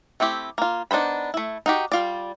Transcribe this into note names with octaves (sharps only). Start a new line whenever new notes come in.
A3 C4 E4 G4
A#3 F4
B3 D4 D#4 C5 B5
A3 E4
D#4 F#4 G4
G3 F4 D5